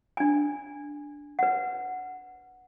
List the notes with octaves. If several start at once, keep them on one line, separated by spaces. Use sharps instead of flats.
D4 G#5
B4 F#5